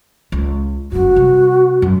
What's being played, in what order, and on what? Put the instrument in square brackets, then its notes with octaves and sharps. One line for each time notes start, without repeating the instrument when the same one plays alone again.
[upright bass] C#2
[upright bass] F#1 F#2 [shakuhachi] F#4
[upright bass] C3 G3
F#2